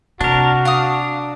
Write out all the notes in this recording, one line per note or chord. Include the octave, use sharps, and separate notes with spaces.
C3 D4 F#4 A#4 A5
D4 F5 D#6